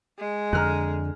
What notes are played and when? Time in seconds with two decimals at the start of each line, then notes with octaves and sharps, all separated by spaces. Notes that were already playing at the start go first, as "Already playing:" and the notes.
0.19 G#3
0.53 F2 D3 A#5 F6 F#6